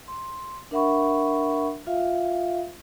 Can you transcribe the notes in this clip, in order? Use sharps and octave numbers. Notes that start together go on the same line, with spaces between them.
C6
D4 A#4 E5 F#5 B5 C#6
F4 E5 F5